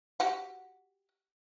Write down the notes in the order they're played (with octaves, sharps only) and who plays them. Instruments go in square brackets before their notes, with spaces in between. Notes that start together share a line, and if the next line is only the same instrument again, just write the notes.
[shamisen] F#4 G4 F#5